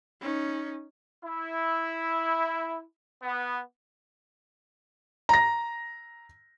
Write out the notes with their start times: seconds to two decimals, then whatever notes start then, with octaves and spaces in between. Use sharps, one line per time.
0.21 C#4 D#4
1.23 E4
3.23 B3
5.29 A#5 A#6